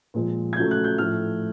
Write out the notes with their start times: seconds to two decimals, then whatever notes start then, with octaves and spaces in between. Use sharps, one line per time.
0.14 A#2 F3 G#3
0.53 G#6
0.56 C#3 F#3 A3 G6
0.71 F#6
0.84 G6
0.98 A2 F3 A3 F6